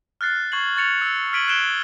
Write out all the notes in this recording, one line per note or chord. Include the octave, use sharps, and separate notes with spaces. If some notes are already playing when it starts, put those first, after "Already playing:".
F6 F#6 A6 C7
C#6 G#6 C7 F#7
C#6 A6 C#7 F7
E6
F6 G#6 B6 D7 D#7 F#7
F#6 G#6 C7 D7 E7 G7